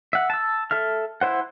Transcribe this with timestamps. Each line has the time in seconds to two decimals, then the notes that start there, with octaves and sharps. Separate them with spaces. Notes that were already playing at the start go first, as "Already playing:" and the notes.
0.13 E5 F#5
0.30 A5 E6
0.71 A4 E5 F6
1.21 E4 C5 F#5